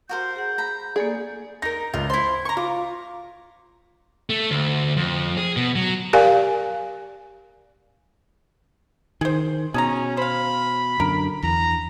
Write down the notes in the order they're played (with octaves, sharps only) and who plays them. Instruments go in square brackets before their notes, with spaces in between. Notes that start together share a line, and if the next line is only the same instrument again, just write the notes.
[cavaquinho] F#4 A#4 C5 [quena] G6
[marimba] G#4 F#5
[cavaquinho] A#5 B5
[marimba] A#3 A4 D5 [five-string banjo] G#4
[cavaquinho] D#4 A#4 [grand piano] A#6
[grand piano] C#2 [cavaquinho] F4
[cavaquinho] E4 C6 [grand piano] C5
[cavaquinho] A#5 C#6
[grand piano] F4 [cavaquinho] D6
[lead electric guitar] A3
D2
F2
G#4
B2
F#3
[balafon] G4 A#4 D5 F5 G#5
[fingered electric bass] D#3 [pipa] G#4 C5
[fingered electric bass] B2 [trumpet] C#4 [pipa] G#4 A5 A#5
[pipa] C5 F5 [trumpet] B5
[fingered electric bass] F#2 D3 [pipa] A#4
[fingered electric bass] E2 [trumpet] A#5